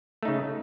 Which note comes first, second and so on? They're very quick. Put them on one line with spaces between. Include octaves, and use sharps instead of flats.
A3 D#4 C#3